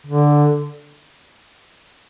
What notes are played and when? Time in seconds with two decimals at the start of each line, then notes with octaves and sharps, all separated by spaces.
0.07 D3